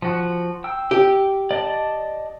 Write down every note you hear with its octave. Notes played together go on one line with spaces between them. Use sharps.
F3 F#4
G5 E6
G4
D5 D#5 A5